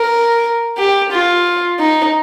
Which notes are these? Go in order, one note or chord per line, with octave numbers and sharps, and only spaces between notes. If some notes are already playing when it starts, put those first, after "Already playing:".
Already playing: A#4
G4
F4
D#4